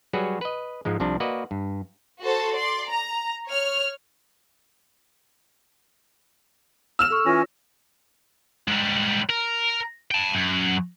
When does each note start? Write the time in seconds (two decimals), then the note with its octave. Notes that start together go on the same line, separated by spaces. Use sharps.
0.13 F#3 G3 F#4 G#4 B4 C#5
0.41 B4 D#5
0.85 G#2 F3 G#3
1.00 C2 C3 F3 D4
1.20 A#3 F#4 B4 D5 D#5
1.51 G2
2.22 F#4 A4 C5 A5
2.54 D5 C6
2.90 A#5
3.47 C#5 F6
6.99 E6 F6 E7
7.10 A4 C#6
7.26 E3 C#4 F4 C#5 A#6
8.68 G#2 G3
9.30 A#4
10.11 G5 A5
10.34 F#2